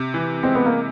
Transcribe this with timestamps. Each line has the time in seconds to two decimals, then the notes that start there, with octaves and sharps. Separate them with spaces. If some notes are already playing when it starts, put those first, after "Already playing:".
Already playing: C3
0.14 E3
0.43 G#3 C4
0.55 B3
0.66 A#3